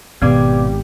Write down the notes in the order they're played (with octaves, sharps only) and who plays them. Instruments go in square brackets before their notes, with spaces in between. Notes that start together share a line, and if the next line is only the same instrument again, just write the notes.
[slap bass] G#1 [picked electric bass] B2 C4 [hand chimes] B3 D5 D6 [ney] G4